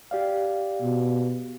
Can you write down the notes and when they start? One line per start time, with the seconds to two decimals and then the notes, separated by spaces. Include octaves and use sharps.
0.11 G4 D5 F5
0.82 B2